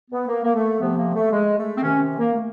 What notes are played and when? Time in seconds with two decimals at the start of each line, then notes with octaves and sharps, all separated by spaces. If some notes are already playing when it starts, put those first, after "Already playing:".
0.11 B3
0.28 A#3
0.44 A#3
0.54 A3
0.80 C3 F3 B3
0.97 A#3
1.14 A3
1.31 G#3
1.57 A3
1.77 C4
1.83 C3 D#3 C#4
2.18 A#3
2.34 A3